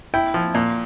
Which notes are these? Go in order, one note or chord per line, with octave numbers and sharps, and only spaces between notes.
E4 G5
F3
A#2